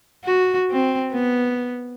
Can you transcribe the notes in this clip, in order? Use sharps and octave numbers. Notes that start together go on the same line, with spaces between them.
F#4
C4
B3